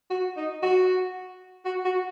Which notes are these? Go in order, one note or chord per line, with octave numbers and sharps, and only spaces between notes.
F#4
D#4
F#4
F#4
F#4